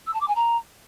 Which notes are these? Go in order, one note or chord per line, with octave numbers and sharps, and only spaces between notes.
E6
A5
D6
G#5
A#5